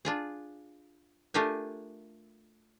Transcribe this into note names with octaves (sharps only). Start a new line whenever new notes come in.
D4 F4 G#4
A3 D4 F4 G4 A#4 G#5